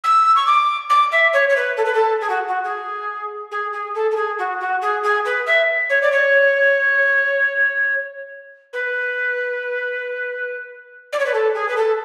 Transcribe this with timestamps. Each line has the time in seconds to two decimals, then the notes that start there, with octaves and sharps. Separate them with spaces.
0.03 E6
0.35 C#6
0.46 D6
0.89 D6
1.11 E5
1.33 C#5
1.49 C#5
1.56 B4
1.77 A4
1.85 B4
1.94 A4
2.20 G#4
2.29 F#4
2.48 F#4
2.64 G#4
3.51 G#4
3.72 G#4
3.94 A4
4.11 A4
4.16 G#4
4.38 F#4
4.60 F#4
4.81 G#4
5.03 G#4
5.25 B4
5.46 E5
5.89 C#5
6.01 D5
6.12 C#5
8.73 B4
11.12 D5
11.19 C#5
11.25 B4
11.33 A4
11.54 G#4
11.68 B4
11.76 A4